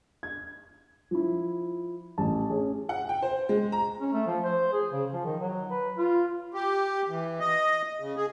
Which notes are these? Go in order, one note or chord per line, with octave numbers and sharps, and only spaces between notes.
G#6
F3 E4
A1 A5
C#4 G#4
F#5
G5
C5
G#3
A#5
C#4
A3
F3
C5
G#4
C#3
F3
D#3
F#3
B4
F4
G4
E3
D#5
C#3
G#4